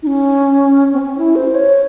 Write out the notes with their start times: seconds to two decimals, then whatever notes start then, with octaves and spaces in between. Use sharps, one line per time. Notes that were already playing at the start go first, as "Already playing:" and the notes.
0.03 D#4
0.07 C#4
0.94 C4
0.99 C#4
1.18 E4
1.36 C5
1.55 C#5